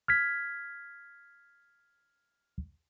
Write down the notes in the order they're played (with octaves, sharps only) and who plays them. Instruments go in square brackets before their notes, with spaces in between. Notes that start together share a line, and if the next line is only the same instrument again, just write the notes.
[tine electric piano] F6 G#6 B6